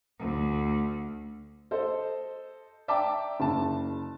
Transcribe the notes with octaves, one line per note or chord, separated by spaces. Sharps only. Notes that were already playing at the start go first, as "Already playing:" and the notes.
D2
A4 C5 D#5
D5 E5 G5 A5 A#5 D6
F#1 A5